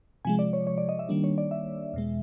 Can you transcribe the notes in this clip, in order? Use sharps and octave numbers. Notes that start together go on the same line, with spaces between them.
C3 F3 G#3 G#5
D5
C#5
C#5
D5
D#5
E5
D#3 G3 A#3 D4
C#5
D5
E5
E2 B2 G#3